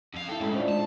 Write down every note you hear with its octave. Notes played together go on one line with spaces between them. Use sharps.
F2 F5
E4 A4 G5
A2 G#3 C#4 B5
D4 F4 C5
A5